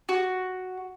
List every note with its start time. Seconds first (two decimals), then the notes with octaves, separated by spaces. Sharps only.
0.09 F#4